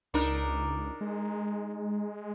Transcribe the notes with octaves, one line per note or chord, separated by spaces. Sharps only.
C#2 D4 D#4 A#4
G#3